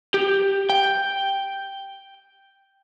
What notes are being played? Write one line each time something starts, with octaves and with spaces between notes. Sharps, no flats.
G4
G5